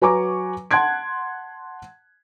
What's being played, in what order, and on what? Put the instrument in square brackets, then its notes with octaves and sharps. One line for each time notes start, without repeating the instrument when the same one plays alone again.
[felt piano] F#3 B4 G#5 A#5 C#6 D6
F#5 A5 C6 F#6 G#6 D7